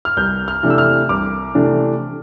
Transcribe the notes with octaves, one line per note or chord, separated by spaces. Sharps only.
F6
C2 G6
F6
C3 E3 A3 D4
E6
F6
C2 D6
C3 E3 A3 D4